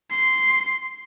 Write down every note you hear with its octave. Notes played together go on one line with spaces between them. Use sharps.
C6